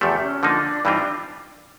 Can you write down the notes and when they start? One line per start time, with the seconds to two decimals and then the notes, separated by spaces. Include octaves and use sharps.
0.01 E2 C3 F3 A3 G4
0.22 C#4
0.43 D3 F3 A#3 D4 D#4
0.85 G2 E3 G3 C4 D#4 F4
0.99 D4